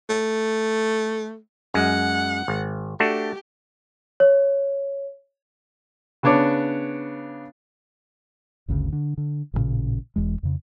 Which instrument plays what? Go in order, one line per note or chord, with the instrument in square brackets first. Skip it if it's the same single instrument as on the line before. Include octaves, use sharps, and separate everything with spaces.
[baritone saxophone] A3
[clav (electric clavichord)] F#2 G#3 [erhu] F#5
[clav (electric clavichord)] G#1
[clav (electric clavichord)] A3 D4 F#4 [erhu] G4
[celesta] C#5
[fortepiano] C#3 B3 D4 C#5 D6
[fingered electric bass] G1 D2 A#2 C#3
D3
D3
A1 G2 A#2 C#3
E1 E2 G#3
F2 C#3